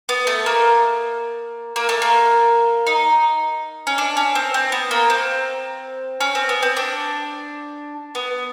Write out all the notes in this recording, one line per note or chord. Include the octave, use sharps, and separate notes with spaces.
B3
A3
A#3
A#3
A3
A#3
D#4
C#4
D4
C#4
C4
C4
B3
A#3
C4
C#4
C4
B3
C4
D4
B3